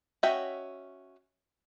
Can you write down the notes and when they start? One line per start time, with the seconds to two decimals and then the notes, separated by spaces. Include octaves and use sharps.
0.23 C#4 F#4 D#5 E5 G5